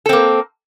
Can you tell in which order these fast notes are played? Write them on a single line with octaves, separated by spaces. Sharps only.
A4 C4 A#3